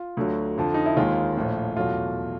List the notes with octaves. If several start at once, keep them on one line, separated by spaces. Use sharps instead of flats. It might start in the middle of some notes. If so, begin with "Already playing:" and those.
Already playing: F4
D2 D3 F#3
F2 D3 F3
D#4
E4
D#2 D#3 G#3 F4
A#1 A2 F3
E2 B2 F#3 A3 F4